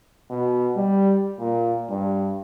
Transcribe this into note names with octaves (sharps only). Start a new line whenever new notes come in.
B2
G3
A#2
G2